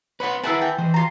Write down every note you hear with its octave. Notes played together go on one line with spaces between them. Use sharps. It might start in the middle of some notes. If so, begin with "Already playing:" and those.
B4 C#5 F#5 B5 C6
E4 G#4 A#4 B4 E5 F#5 G#5 A5
G5
E3 C5 D#5
F4 A#5